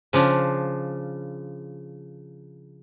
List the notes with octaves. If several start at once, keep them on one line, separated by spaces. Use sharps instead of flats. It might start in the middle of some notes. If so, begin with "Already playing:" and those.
C#3 F3 D4